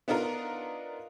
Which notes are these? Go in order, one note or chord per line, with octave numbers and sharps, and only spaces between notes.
B3 D4 D#4 F4 A#4